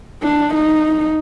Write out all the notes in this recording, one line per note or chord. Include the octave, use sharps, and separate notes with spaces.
D4
D#4